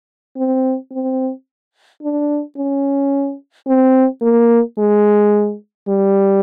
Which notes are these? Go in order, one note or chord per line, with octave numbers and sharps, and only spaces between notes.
C4
C4
D4
C#4
C4
A#3
G#3
G3